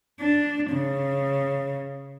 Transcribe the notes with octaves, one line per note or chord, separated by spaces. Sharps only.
D4
C#3